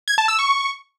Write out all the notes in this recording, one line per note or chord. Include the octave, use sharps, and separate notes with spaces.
G#6
A5
E6
C#6